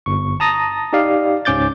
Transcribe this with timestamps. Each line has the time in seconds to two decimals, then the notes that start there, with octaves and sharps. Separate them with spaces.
0.06 G1 C#6
0.40 A5 A#5 D#6 A6 A#6
0.93 D#4 G4 D5 F5
1.45 C#2 G#2 C#4 D6 G6 A6